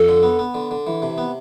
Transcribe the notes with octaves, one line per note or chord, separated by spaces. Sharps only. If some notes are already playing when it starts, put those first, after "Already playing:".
Already playing: F2 A4
D3
B3
B3
D3
D3
E3
C3
B3